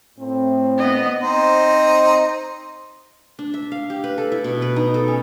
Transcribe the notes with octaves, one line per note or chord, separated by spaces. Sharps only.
A2 C4
B3 D#5
C4 D#4 C5
D4
E5
F5
G4
B4
A4
E4
B2
B4
D#4
A4
C#4